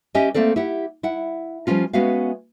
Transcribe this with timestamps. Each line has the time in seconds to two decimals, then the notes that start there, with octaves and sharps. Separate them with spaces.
0.15 C#4 G4 D#5 E5 G#5
0.34 A3 A#3 C4 A4 D5
0.56 E4 G4 F#5
1.03 E4 F#5
1.67 F3 G3 A#3 C#4 F4
1.93 G#3 B3 C#4 F#4 E5 F5